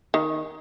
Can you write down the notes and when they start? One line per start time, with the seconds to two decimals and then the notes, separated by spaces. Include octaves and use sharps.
0.14 D#3